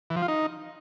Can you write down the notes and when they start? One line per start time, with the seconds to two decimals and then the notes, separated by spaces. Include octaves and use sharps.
0.10 E3
0.16 F3
0.22 F4
0.28 D#4